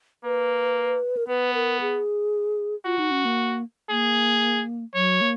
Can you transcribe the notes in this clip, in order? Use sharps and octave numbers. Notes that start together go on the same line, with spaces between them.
A#3 B4
A#4
B3 B4
A#4
G#4
F4 F#4
D#4
C#4
A#3
A#3 G#4
F#3 C#5
A#3